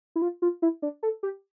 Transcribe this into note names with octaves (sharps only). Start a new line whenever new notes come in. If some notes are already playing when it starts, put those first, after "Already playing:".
E4
F4
F4
E4
D4
A4
G4